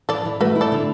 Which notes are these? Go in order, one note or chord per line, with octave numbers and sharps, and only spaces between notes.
E3 A4 D5
E3
A3 F#4 B4
E4
A4 D5
D3